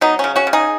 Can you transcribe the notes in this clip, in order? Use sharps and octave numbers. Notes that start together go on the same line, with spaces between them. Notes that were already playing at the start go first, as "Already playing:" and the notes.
F#3 B3 D#4
C#3 C#4
C#4 F#4
C#3
D#4 G#4